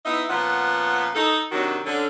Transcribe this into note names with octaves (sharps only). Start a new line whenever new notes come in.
B3 D#4 E4 D#5 E5
A#2 F3 B3 C#4 F#5
D#4 A4
C3 D#3 F#3 D4 F#4 A#4
D3 C#4